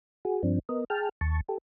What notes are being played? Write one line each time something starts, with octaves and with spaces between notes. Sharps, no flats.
F#4 G#4
G2 F3 C4 D4
B3 A#4 D#5
G#4 G5 A5 F6
D#2 A5 C#6
G4 A4